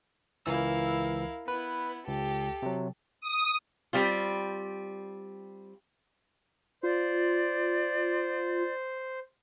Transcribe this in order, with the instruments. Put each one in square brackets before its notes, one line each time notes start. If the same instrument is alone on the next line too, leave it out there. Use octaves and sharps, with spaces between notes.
[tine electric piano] C#2 E3 E6 [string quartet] E4 A#4 F5
[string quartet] B3 E4 [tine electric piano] B4
[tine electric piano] C#2 [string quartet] G4 A4
[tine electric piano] C3 F#3
[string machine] D#6
[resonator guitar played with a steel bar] G3 C4 F4
[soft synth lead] F4 [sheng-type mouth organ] C5 [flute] D5